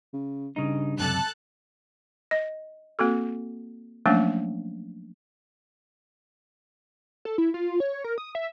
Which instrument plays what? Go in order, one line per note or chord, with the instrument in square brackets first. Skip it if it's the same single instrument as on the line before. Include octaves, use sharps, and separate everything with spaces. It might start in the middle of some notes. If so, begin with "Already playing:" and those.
[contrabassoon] C#3
[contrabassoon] G2 [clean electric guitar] C#3 D#4
[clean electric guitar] C#2 F#2 C3 [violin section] A4 A5 F#6
[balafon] D#5
A#3 C4 F#4 A4
F3 F#3 A3 A#3 C#4 D4
[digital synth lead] A4
E4
F4
C#5
A#4
D#6
E5